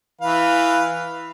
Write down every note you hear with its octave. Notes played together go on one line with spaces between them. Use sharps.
E3 B4 F5